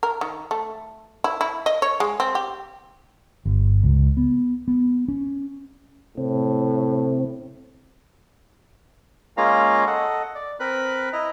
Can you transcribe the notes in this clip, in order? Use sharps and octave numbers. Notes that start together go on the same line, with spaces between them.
A#4
D#3
A3
E4
E4
D#5
C#5
G#3
C4
G4
G1
C#2
B3
B3
C#4
A2 C3 C4
G#3 A#3 C#4 F4 F5 A#5
A4 D#5 F#5
D5
C4 A#4 B4 B5 F#6
E4 D#5 A#5